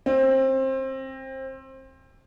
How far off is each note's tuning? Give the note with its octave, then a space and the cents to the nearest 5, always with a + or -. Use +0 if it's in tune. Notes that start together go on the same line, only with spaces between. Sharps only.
C4 +25